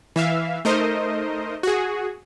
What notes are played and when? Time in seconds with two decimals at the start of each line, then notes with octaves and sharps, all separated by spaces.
0.16 E3 E5 F5
0.65 A3 D#4 A#4 C5 D#5
1.63 F#4 G#4